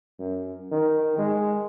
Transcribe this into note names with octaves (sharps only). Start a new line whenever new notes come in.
F#2
D#3
G#3